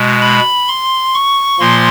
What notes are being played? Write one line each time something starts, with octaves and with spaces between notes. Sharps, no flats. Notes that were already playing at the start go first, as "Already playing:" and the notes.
Already playing: B2 G#3
B5
C6
C#6
A#2 F3 A#3 C6